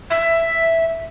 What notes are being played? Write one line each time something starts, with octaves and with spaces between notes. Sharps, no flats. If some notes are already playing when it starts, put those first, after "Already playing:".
E5